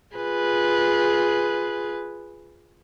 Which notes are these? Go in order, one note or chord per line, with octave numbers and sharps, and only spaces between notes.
F4 G#4 B4